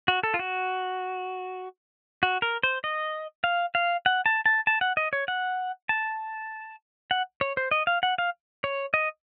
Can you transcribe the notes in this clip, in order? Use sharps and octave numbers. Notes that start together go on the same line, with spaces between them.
F#4
A4
F4
F#4
F#4
A#4
C5
D#5
F5
F5
F#5
A5
A5
A5
F#5
D#5
C#5
F#5
A5
F#5
C#5
C5
D#5
F5
F#5
F5
C#5
D#5